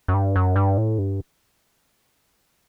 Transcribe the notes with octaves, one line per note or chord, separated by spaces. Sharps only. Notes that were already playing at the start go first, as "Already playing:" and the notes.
F#2
G2
F#2
G2
A2
G2